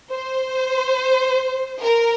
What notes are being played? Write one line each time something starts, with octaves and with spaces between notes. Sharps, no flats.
C5
A#4